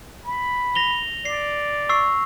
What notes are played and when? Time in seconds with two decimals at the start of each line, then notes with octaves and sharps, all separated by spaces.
0.24 B5
0.75 A#6 F7 G7
1.25 D5 C7
1.89 C#6 E6 C7